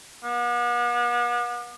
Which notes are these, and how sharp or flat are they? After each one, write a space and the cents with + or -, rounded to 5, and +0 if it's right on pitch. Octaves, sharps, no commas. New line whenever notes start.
B3 -45